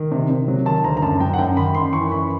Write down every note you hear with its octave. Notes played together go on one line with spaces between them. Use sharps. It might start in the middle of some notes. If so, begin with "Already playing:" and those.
Already playing: D#3
C3
C3
F#3
D#3 A5
D2 A#5
A#5
F#2 A5
F#3 G5
F#5
F#2 G5
D#3 B5
F#2 C6
E3 C#6
F#2 B5